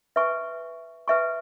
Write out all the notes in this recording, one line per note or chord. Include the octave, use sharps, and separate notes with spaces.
B4 E5 G#5 C#6
B4 E5 G#5 C#6